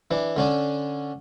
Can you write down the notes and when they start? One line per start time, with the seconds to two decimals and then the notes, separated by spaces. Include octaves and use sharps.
0.11 E3 D4
0.36 D3 C#4 D4